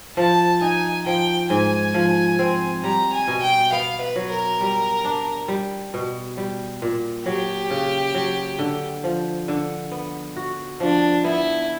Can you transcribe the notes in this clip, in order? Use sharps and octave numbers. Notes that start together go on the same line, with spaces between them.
F3 A5
D#4 G#5
F3 G5
G#2 G#5
F3
C4
G3 A#5
G#5
B2
G5
B3 F5
B4
F#3
A#4
G3
D4
G3
B2
G3
A#2
F#3 G4
C#3
F#3
D3
F3
D3
B3
F#4
F3 D4
B3 E4